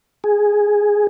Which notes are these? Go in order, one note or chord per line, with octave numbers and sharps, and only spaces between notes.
G#4